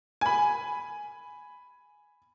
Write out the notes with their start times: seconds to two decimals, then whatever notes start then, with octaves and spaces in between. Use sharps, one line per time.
0.21 G#5 B5